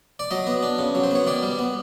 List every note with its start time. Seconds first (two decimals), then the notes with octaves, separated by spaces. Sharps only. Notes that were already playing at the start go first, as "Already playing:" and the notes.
0.19 D5
0.31 F#3 D#5
0.47 B3
0.63 D4
0.79 C#3
0.95 F#3
1.03 C5
1.11 B3 C#5
1.27 D#3 D5
1.43 G3
1.59 B3